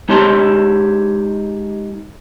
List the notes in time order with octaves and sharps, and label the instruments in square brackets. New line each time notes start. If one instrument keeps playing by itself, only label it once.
[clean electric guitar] G#3 D#4 G4 C#5 A5 C6